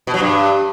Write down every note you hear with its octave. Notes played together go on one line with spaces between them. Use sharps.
B2
F#3
G2